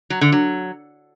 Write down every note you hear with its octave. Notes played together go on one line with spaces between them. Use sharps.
F#3
D3
F#3